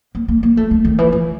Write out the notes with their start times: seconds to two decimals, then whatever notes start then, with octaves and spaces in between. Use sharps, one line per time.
0.15 A#3
0.28 A#3
0.43 A#3
0.57 A3
0.71 A3
0.85 D#3
0.98 E3
1.12 E3